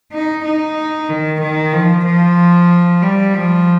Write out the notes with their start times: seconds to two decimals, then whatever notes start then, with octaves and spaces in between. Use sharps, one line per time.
0.12 D#4
0.44 D#4
1.09 D#3
1.41 D#3
1.73 F3
2.05 F3
3.02 G3
3.34 F3